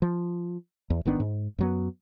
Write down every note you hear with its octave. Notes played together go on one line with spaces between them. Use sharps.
F3
E2
G#1 D#3 B3 D4
G#2
F#2 F#3 B3